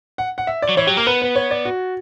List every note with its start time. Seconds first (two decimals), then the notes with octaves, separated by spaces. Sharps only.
0.18 F#5
0.38 F#5
0.47 E5
0.62 D5
0.69 F#3
0.77 E3 C#5
0.87 F#3 G4
0.97 A#3 A#4
1.07 B3 B4
1.22 B4
1.36 C#5
1.51 D5
1.65 F#4